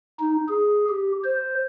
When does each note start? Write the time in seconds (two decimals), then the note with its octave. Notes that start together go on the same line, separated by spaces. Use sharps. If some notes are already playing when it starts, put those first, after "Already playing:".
0.19 D#4
0.48 G#4
0.89 G4
1.24 C5